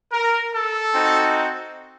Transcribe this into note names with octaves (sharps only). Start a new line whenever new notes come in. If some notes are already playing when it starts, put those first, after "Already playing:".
A#4
A4
C4 D#4 F#4